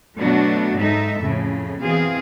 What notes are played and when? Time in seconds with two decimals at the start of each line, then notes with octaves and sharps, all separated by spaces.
0.20 B2 F#3 A3 D4 F#4
0.79 G#2 D#4 A4 E5
1.21 F2 A2 C#3
1.82 B2 E3 C4 G#4 F5